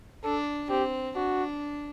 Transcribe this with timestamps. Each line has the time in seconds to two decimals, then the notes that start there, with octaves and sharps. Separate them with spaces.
0.23 D4 A4
0.70 C4 G4
1.16 D4 F#4